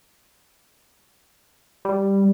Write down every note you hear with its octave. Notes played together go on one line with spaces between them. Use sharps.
G3